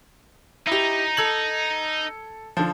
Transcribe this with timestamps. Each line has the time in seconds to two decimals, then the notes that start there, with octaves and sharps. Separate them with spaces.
0.67 D#4 E4 G4
1.17 A4 G#6 F#7
2.57 D3 F3